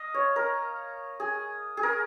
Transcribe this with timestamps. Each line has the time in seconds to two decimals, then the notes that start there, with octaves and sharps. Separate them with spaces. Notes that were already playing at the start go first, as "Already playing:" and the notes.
Already playing: D#5 F5
0.14 C#5
0.36 A#4
1.20 G#4
1.77 G#4
1.83 A#4